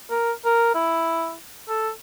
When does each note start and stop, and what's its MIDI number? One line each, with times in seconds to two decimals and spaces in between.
0.10 0.32 70
0.45 0.71 70
0.75 1.35 64
1.69 1.90 69